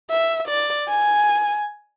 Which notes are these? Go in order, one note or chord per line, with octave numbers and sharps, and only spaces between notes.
E5
D5
G#5